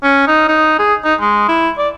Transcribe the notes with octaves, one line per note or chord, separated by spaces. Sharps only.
C#4
D#4
D#4
G#4
D#4
G#3
E4
D5